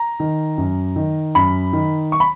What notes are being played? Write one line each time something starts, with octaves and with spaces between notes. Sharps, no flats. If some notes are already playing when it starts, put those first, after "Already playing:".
Already playing: A#5
D#3
F#2
D#3
F#2 B5
D#3
C#6
B5